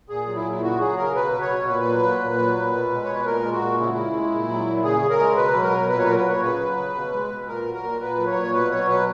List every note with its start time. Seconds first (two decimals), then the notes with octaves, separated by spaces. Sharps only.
0.09 A#2 G#4
0.26 F#3
0.36 E4
0.44 A#2
0.52 E4
0.62 C#3 F#4
0.79 F#3 G#4
0.97 C#3 A#4
1.14 B2 B4
1.32 F#3
1.41 C#5
1.50 B2
1.67 A#2 B4
1.85 F#3
2.03 A#2
2.21 A#2
2.37 F#3
2.55 A#2
2.73 B2
2.90 G#3
3.04 B2 C#5
3.14 B4
3.26 A#2 A#4
3.44 G#3
3.53 F#4
3.60 A#2
3.78 C#3 E4
3.96 C#3
4.14 G#3
4.32 A#2
4.48 F#3
4.67 A#2
4.83 C#3 G#4
5.01 C#3
5.10 A#4
5.20 G#3
5.36 B2 B4
5.55 F#3
5.63 A#4
5.71 B2
5.89 A#2 B4
5.99 C#5
6.03 B4
6.07 F#3 A#4
6.16 B4
6.25 A#2 C#5
6.42 C#3 B4
6.60 F#3
6.77 C#3
6.95 B2
7.13 G#3
7.30 B2
7.47 A#2 A#4
7.66 F#3
7.74 A#4
7.83 A#2
8.01 A#2 B4
8.18 F#3
8.27 C#5
8.35 A#2
8.53 B2 B4
8.71 F#3 C#5
8.88 B2 B4